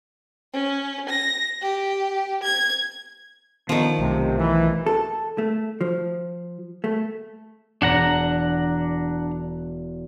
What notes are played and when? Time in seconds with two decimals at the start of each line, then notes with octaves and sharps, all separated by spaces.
0.53 C#4
1.09 A#6
1.62 G4
2.43 G#6
3.69 D3 D#3 F3 B3
3.99 B1 C3 A3
4.37 E3
4.86 A4
5.38 A3
5.81 F3
6.84 A3
7.82 E1 D4 F#5 A#5